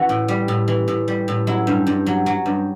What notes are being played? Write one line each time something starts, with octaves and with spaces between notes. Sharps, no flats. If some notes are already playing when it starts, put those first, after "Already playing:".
Already playing: E3 F#4
A2
G3
A2
E3
A2
G3
A2
F#3 E4
G2
G2
F#3
F#3
G2